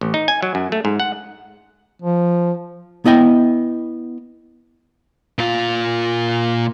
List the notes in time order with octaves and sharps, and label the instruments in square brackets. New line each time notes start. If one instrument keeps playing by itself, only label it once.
[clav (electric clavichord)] A1
D#4
G#5
F#3
F#2
A3
G#2
F#5
[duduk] F3
[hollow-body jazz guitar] B3 E4 D#5 G5
[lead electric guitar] A#2 F4